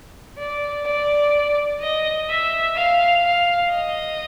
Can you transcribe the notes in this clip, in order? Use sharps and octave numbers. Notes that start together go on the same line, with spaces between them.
D5
D5
D#5
E5
F5
F5
D#5